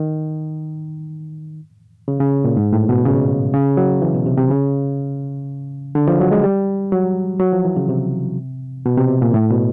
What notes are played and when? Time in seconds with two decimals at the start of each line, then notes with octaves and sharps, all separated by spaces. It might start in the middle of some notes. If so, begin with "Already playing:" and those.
Already playing: D#3
2.08 C#3
2.20 C#3
2.44 A#2
2.57 G#2
2.73 A2
2.89 B2
3.05 C#3
3.53 C#3
3.77 F#3
4.02 E3
4.14 B2
4.26 C3
4.38 C3
4.50 C#3
5.95 D3
6.08 F3
6.20 F#3
6.31 G#3
6.44 G3
6.92 F#3
7.40 F#3
7.53 F3
7.65 E3
7.76 C#3
7.89 C3
8.86 B2
8.98 C3
9.22 A#2
9.34 A2
9.51 B2